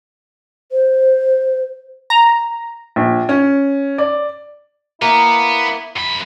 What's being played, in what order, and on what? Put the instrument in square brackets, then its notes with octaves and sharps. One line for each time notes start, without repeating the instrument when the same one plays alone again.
[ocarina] C5
[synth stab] A#5
[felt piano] A#1
C#4
D5
[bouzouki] A#3 [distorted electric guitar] B3 [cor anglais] E4
[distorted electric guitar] F#2 B5